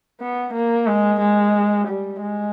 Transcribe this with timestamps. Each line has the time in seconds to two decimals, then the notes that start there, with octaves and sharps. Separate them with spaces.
0.21 B3
0.54 A#3
0.87 G#3
1.21 G#3
1.88 G3
2.22 G#3